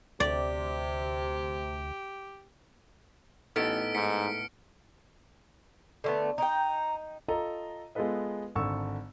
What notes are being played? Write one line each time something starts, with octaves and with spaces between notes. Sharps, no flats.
D2 C3 G4 D5
A1 A2 A3 B3 D#4 F6 B6 D7
G#2 B6 C#7 D7
D3 A3 B3
D#4 G5 A#5
F4 A4 D#5 A#5
G#3 B3 F4 A4 B4 D#5
G#1 D3 A4 C#6 E6